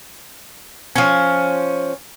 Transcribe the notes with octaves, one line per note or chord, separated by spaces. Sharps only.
F3 C#4